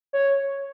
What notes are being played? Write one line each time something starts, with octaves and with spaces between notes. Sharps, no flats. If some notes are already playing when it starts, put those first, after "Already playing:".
C#5